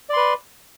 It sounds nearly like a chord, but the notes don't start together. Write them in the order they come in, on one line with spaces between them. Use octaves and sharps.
D5 C6 B4